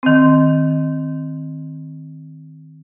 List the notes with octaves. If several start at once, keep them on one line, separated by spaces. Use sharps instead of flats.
D#3 C4